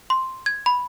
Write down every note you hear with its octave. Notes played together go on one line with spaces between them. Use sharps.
C6
G#6
B5